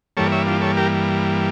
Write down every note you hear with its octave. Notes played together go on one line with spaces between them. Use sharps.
G2 E3 G3 A#3 A4 C#5
C#5 E5
D4 F4
A4 C#5
G4 A#4